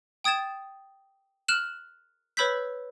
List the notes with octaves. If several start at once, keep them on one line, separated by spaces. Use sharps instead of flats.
G5 D#6 G#6 A6 E7
F6 F#6 E7 F#7
B4 C#5 B5 E6 G6 B6